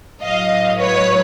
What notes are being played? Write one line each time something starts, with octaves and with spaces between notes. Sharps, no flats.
A2 F#3 D#5 F5
B4 C#5